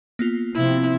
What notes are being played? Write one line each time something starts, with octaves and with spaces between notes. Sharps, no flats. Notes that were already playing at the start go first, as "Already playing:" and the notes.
A#3 B3 F4
C3 F3 C4 E4